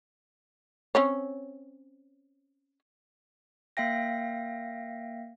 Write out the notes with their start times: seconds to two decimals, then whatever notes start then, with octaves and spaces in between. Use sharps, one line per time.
0.95 C4 C#4 C#5
3.77 A#3 E5 F5 G5 A#6